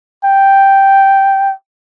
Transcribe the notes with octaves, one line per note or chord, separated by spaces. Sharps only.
G5